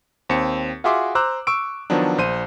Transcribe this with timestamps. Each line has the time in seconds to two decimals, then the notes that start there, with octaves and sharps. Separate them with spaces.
0.29 D#2 C4 C#7
0.84 F4 F#4 G#4 E5 C6 D6
1.15 C5 A#5 D6 E6 F#6
1.47 C#6 E6 D7
1.90 D#3 F3 F#3 B3 D4
2.18 A#1 C5 D#7